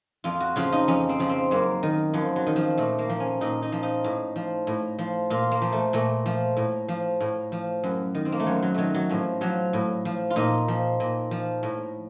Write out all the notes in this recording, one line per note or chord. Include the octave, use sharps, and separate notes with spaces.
F2 F4
F#4
C#3 F3 F4
D#4
F2 C#4
C4
C#3 F3
C4
F#2 A#3
D#3
F#2 F3
F#3
D#3
F3
A#2 A3
A#3
F3
C#4
A#2 D#4
D#4
F3
D#4
A2
F3
A2
F3
A#2 F4
A#3
F3
A3
A#2 A3
F3
A2
F3
A2
F3
F#2
D#3
C4
A#3
A3
F#2 F#3
F#3
D#3 F#3 A3
F#3
A2 F3
F3 F#3
A2
F3
F4
A#2 D#4
F3
A#2
F3
A2